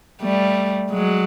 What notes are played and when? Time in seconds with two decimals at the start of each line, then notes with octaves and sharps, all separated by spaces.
0.22 G3 A3
0.91 F#3 G#3